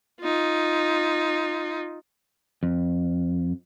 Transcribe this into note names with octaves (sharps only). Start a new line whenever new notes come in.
D#4 F4
F2